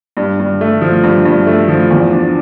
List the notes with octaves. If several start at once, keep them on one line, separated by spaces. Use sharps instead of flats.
G2
G2
A3
F3
G2
G2
A3
F3
E2
D4